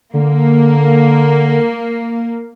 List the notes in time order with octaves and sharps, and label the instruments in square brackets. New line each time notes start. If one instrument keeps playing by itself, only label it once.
[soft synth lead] D3 [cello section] A#3